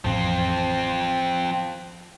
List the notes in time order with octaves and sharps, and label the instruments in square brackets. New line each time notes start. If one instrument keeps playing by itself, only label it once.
[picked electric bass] A1 F2 [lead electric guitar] F3 C4